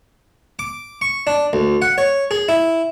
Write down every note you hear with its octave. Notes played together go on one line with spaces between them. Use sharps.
D6
C#6
D4
D2
F#5
C#5
G#4
E4